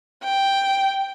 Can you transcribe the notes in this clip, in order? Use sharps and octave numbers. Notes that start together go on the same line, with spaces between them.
G5